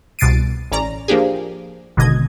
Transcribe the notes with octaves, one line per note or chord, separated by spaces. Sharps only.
C2 B2 A6 C7 D7 D#7
A1 C#4 D5 A#5
F3 A#3 D4 G4 G#4
G#1 B2 D3 D#5 G#6